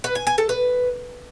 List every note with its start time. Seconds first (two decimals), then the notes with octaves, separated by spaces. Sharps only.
0.04 B4
0.15 G#5
0.27 G#5
0.38 A4
0.49 B4